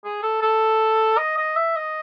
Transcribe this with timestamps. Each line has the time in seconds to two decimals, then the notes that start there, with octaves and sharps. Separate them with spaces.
0.05 G#4
0.23 A4
0.42 A4
1.18 D#5
1.38 D#5
1.56 E5
1.76 D#5